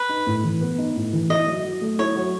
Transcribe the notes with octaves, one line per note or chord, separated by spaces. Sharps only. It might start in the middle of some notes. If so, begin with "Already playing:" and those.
Already playing: B4
D#4
A2
E3
B3
D#4
A2
E3
E4 D#5
F#3
F#3
A3
E4 C#5
F#3